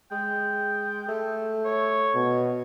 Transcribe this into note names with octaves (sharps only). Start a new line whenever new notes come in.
G#3 G5
A3
C#5
B2